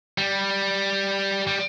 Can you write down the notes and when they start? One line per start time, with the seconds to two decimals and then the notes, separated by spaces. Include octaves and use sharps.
0.18 G3
1.47 G3